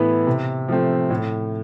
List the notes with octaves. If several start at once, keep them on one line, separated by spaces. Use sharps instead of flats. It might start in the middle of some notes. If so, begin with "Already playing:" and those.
Already playing: A2 E3 B3 E4 B4
C3
F3 A3 C4
A2